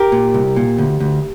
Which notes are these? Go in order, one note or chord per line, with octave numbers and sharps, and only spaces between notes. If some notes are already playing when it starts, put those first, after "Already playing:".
Already playing: G4 A#4
A#2
C2
A#2
D2
D2